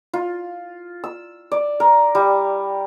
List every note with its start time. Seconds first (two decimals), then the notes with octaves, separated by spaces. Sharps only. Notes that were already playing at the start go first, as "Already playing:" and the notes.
0.13 F4
1.04 E6
1.52 D5
1.80 A#4
2.15 G3